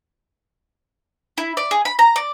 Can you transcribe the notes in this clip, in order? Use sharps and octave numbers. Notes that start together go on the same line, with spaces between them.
E4
D5
G#4
B5
A#5
D5